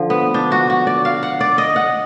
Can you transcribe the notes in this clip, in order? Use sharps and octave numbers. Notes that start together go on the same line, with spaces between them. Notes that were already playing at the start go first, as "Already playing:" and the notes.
Already playing: D3 F3
B3
D4
F#4
F#4
D5
F5
F#5
D5
D#5
F#5